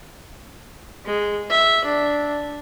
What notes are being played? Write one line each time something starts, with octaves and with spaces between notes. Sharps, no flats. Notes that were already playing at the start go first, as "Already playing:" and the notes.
G#3
E5
D4